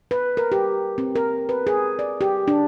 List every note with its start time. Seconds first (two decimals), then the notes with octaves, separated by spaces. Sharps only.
0.11 B4
0.37 A#4
0.52 G4
0.98 C4
1.15 A#4
1.49 B4
1.67 G#4
1.99 D5
2.21 G4
2.48 D4